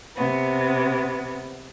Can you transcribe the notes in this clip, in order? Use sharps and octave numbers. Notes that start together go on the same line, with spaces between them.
C3 B3